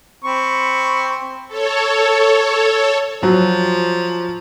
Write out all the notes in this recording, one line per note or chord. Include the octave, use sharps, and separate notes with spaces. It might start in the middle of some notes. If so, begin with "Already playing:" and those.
C4 B5 C#6
A4 C#5
F3 F#3